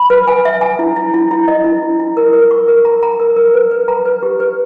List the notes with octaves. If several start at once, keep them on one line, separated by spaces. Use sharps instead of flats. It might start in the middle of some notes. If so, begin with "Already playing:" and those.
Already playing: B5
B4
G#5
E5
G#5
E4
E4
E4
E4
D#5
E4
E4
E4
A#4
A#4
C#6
A#4
A#5
A#5
A#4
A#4
B4
B4
A#5
B4
G4
B4